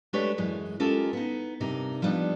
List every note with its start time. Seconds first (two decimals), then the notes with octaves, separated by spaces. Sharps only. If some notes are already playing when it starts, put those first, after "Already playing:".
0.13 G#3 A3 D4 G4 B4 C#5
0.38 F#2 E3 G#3
0.80 G#3 C#4 F4 G4 A4 A#4
1.13 B3 D#4
1.60 G2 C3 A#3 D#4
2.02 F3 G3 B3 D4 D#4